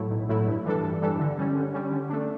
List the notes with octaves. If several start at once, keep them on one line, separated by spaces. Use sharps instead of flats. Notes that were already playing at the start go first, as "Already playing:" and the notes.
Already playing: A2 F#3 A3 E4
B1
A2 F#3 A3 E4
G2
E3 G3 D4 A4
G2
E3 G3 D4 A4
D3
G3 C#4
D3
G3 C#4
D3
A3 D4